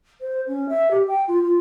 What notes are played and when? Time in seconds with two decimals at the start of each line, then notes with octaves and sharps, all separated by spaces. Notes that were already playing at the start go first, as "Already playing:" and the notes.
0.21 C5
0.47 C#4
0.69 E5
0.91 G4
1.08 G5
1.28 F4
1.44 F4